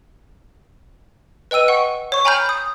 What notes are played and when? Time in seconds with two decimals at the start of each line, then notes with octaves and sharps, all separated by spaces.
1.51 B4 D#5 G5 E6 D#7
1.68 F#5 G5 C#6
2.12 C#5 C#6
2.25 G5 G#5 A#5 B5 F6 G6
2.46 D#6 G6